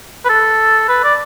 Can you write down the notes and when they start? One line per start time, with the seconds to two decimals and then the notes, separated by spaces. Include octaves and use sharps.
0.25 B4
0.29 A4
0.88 B4
1.04 D5